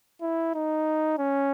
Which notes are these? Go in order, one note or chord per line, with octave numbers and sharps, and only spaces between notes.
E4
D#4
C#4